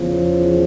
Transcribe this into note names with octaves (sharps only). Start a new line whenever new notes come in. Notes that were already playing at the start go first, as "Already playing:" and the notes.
Already playing: E2 C#3 F3